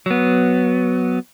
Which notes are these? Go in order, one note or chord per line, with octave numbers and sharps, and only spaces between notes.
F#3 B3